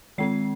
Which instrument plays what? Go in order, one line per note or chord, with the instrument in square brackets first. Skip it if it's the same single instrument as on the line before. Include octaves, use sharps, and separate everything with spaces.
[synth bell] D#3 G#3 C4 C7